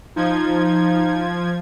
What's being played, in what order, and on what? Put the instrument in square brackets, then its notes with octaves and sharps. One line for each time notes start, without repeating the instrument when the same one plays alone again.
[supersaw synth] F3 G#6 [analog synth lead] D#4